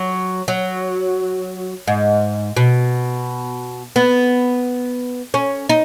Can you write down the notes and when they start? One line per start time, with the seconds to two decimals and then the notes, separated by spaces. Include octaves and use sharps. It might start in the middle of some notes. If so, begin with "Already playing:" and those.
Already playing: F#3
0.48 F#3
1.87 G#2
2.57 B2
3.96 B3
5.34 C#4
5.69 D#4